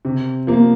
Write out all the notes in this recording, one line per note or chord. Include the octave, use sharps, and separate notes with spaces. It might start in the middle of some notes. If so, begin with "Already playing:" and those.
C3
F3 A#3